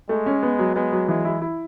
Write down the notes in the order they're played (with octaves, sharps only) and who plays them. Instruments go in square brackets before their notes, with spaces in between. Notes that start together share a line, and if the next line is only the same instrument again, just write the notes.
[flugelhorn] G#3 [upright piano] A3
[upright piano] C#4
B3
F#3
[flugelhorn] G#3 [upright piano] B3
[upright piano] F#3
[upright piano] E3 [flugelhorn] G#3
[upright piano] E4
E4